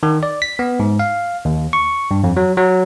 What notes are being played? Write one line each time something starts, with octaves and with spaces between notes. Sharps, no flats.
D#3
D5
B6
B3
G#2
F5
D#2
C#6
G2
F2
F#3
F#3